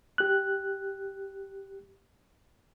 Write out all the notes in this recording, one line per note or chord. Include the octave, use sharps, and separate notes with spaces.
G4 F#6